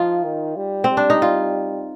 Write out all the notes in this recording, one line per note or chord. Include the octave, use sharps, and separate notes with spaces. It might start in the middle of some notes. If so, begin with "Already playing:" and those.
Already playing: F3 D#4 F4
D#3
G3
C4
G3
D4
D#4
F4